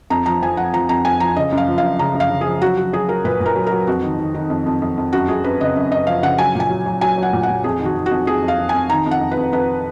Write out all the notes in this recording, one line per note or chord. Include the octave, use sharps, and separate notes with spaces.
F2 A#5
F3 A#5
F3 G#5
F3 F#5
F3 A#5
F2 A#5
F2 G#5
F3 A#5
C#3 D#5
F#2
F5
F3
F5
F#2
C#3 A#5
F#2
F5
C#3
G#4
F3
F#3 F#4
F#3 F#4
F#3 G#4
F#3 A#4
A#2 B4
A#2
A#4
F#3
A#4
F#3
F2 F#4
D#3
D#3
D#3
F2
F2
F2
F2
F#2 F#4
F#2 G#4
F#2 B4
C#3 D#5
F#2
F#2 D#5
F3 F5
C#3 F#5
F#3 G#5
A#2
G#5
F#3
F#3
F#3 G#5
F#3
F#5
A#2
F#5
A#2
F2 G#4
D#3
F#4
D#3
F#4
F2
F2 G#4
F2
F5
F2
G#5
F2
D#3 A#5
F2
F#5
F2
B4
F2
F2 B4